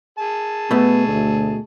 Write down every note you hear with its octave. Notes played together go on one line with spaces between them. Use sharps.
G#4 A5
B2 A3 B3
D2